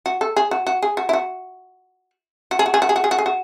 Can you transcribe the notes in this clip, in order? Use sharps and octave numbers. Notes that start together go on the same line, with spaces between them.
F#4
A4
G#4
F#4
F#4
G#4
F#4
E4
F#4
F#4
G#4
F#4
G#4
F#4
G#4
F#4
G#4
F#4
G#4
F#4